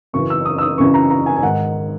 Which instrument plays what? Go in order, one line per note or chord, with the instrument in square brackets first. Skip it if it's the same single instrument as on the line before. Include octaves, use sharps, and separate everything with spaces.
[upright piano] F#2 C#3 E3 C#6
E6
D#6
E6
D#6
F#2 C#3 E3 C#6
A#5
A#5
G#5
G#5
G#2 D#3 F#5